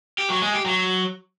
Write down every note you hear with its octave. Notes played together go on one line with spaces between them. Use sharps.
G4
F#3
G#3
G4
F#3